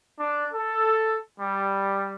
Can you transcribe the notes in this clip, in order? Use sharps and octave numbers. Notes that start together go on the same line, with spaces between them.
D4
A4
G3